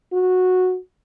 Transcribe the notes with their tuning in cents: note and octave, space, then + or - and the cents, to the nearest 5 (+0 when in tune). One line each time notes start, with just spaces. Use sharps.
F#4 -10